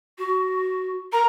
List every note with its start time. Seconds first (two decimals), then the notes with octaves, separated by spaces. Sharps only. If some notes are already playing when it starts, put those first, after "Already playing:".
0.18 F#4
1.12 A#4 A#5